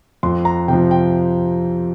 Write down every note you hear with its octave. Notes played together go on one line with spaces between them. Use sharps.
F2 C6
A#5
C3 F3 G5
G5